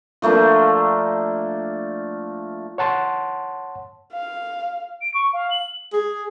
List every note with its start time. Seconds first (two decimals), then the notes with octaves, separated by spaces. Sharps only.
0.22 F3 A3 A#3 D4
2.78 C#5 F#5 A5 C6
4.13 F5
5.02 D7
5.14 C#6
5.33 F5
5.51 F#7
5.93 G#4